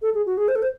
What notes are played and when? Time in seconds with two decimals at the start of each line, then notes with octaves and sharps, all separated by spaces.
0.02 A4
0.14 G#4
0.26 F#4
0.37 G#4
0.48 C5
0.55 A4
0.62 C5